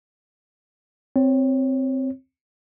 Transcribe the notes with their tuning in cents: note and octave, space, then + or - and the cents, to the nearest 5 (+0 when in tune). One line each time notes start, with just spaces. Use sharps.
C4 +0 C#5 -5